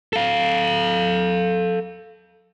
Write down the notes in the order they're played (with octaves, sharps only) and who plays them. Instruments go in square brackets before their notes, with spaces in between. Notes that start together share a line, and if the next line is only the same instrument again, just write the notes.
[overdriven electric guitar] A4 F5